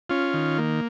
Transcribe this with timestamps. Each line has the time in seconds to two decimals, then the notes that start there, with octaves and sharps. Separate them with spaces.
0.10 C#4 F4
0.34 D#3
0.58 A#3